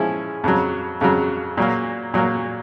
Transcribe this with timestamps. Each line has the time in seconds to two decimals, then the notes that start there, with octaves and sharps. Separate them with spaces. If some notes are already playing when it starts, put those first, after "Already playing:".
Already playing: F3 G#3 C#4 E4
0.44 F2 C#3 F#3
1.01 F2 C#3 F#3
1.57 A#2 F#3 A#3
2.14 A#2 F#3 A#3